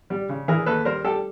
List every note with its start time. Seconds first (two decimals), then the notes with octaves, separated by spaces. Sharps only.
0.10 G3
0.29 C#3
0.48 E3 G#4 A#4
0.66 D#2 A4 B4
0.85 G3 A#4 C5
1.04 G3 G4 A4